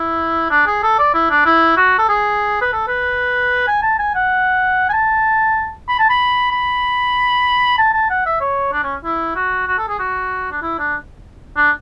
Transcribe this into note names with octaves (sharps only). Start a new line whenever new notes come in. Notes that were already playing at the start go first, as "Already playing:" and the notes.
Already playing: E4
D4
G#4
A4
D5
E4
D4
E4
F#4
A4
G#4
B4
A4
B4
G#5
A5
G#5
F#5
G#5
A5
B5
A5
B5
B5
A5
A5
F#5
E5
C#5
D4
C#4
E4
F#4
F#4
A4
G#4
F#4
D4
E4
D4
D4